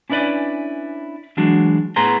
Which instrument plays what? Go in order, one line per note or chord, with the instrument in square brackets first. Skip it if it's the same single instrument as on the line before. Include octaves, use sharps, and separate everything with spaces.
[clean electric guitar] C#4 D4 E4 B4 D5 G#5
E3 F#3 G#3 D4 F#4
A2 B3 G#4 B4 A#5 C6